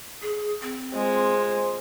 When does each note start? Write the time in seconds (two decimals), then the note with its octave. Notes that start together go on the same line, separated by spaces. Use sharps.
0.22 G#4
0.62 C4
0.94 G#3 F4 C5